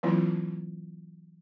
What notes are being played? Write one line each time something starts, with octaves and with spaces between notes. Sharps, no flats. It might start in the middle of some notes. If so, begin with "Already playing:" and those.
E3 F#3 A#3 C4 E4 F4